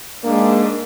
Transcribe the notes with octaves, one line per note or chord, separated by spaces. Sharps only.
G#2 A#3 D4